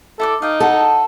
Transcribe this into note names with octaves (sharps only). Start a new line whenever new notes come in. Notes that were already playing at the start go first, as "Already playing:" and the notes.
E4 A4 D5 D6
D#4 F5 G5
F#4 A4 D#5